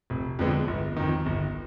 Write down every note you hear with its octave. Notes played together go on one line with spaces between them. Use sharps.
F1
F2 D3 G#3 B3
G1
F2 D#3
G1